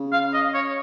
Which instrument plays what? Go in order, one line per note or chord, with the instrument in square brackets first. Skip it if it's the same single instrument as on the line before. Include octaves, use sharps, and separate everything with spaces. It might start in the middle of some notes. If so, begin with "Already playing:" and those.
Already playing: [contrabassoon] C#3
[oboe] F5
D#5
C#5